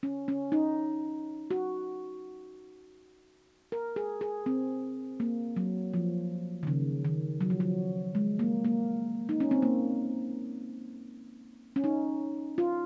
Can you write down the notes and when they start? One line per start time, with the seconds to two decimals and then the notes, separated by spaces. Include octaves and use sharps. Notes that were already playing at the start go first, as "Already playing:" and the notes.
0.03 C#4
0.28 C#4
0.52 D#4
1.51 F#4
3.72 A#4
3.96 G#4
4.21 G#4
4.46 C4
5.20 A#3
5.56 F#3
5.94 F3
6.63 D#3
6.67 C#3
7.05 D#3
7.41 F#3
7.50 F3
7.60 F#3
8.15 G#3
8.39 A#3
8.65 A#3
9.29 D#4
9.40 C#4
9.51 C4
9.62 A#3
11.76 C#4
11.84 D#4
12.58 F4